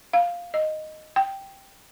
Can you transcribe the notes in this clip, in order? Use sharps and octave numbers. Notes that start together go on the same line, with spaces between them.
F5
D#5
G5